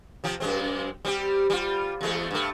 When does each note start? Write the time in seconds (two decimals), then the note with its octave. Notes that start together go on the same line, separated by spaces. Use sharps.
0.24 C3 F3 C4
0.40 F#2 G#3 C4
1.05 G3 C4 G4
1.50 G3 F4
2.01 E2 G#3 A3
2.31 G2 A3